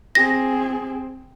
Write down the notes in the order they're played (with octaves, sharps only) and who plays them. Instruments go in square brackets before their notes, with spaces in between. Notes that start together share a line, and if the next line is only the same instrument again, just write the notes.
[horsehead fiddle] C4 G#4 [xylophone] A#6